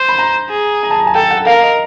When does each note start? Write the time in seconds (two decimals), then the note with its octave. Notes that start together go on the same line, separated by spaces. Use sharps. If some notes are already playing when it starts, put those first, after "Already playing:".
Already playing: C5
0.09 B5
0.19 A#5
0.50 G#4
0.83 A#5
0.91 A5
0.99 A#5
1.07 G#5
1.15 A4 G5
1.31 F#5
1.46 A#4 F5
1.62 D#5